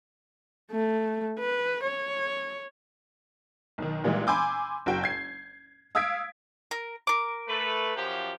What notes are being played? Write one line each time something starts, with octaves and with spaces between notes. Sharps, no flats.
A3
B4
C#5
B1 D#3
A#2 E3 G3 G#3
G#5 B5 C6 D6 E6 G6
F#1 F#4 G5 G6
G#6 C7
F5 D#6 E6 G#6 B6 D7
A#4
A#4 D6
A3 B4
F#2 F3 G4